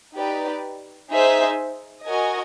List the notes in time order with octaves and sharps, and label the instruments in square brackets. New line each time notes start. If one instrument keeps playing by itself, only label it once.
[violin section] D#4 G4 B4 D5
D#4 G#4 C5 E5
F#4 A#4 D#5 G#5